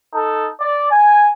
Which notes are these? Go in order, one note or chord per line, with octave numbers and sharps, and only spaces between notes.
D#4 A4
D5
G#5